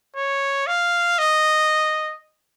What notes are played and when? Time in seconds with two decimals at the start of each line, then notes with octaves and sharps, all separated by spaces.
0.16 C#5
0.67 F5
1.19 D#5